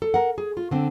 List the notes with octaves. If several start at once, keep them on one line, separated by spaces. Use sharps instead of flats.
A4
A#4 F#5
G#4
F4
D3 C4